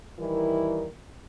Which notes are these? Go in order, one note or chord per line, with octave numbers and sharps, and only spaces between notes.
D#3 E3 G3 E4 A#4